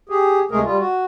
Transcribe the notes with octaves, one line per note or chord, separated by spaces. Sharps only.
G4 G#4
D2 C3 G#3 A3 G#4 A#4
G3 F4
F#4